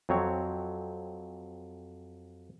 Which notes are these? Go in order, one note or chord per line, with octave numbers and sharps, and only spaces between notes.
F2 F#3 C4 C#5